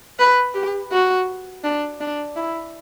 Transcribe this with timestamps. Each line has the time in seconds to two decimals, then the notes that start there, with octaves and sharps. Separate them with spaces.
0.19 B4
0.54 G4
0.92 F#4
1.64 D4
2.00 D4
2.36 E4